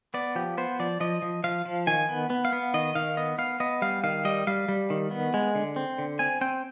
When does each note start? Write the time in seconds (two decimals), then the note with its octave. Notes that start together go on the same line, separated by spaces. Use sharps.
0.14 B3 D5
0.35 F3 G4
0.58 B3 C5
0.79 F3 D5
1.00 F3 D#5
1.22 F3
1.44 F3 F5
1.66 F3
1.87 D#3 G#5
2.09 B3
2.30 B3
2.45 F5
2.52 B3
2.74 D#3 D#5
2.95 D#3 F5
3.17 B3 D#5
3.38 B3 F5
3.60 B3 D#5
3.82 G3 F5
4.04 D#3 F5
4.25 G3 D#5
4.47 G3 F5
4.68 G3
4.90 D#3
5.11 B3
5.34 G#3
5.55 D3
5.76 C4
5.98 D3
6.19 C4 G#5
6.41 C4 G5